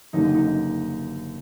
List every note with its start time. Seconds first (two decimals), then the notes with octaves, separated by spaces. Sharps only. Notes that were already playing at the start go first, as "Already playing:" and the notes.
0.13 F#1 F#2 D3 G3 A#3 D#4
0.34 D#4